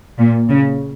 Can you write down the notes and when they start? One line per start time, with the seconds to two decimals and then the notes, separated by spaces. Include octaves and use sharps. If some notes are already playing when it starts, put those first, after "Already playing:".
0.19 A#2
0.50 C#3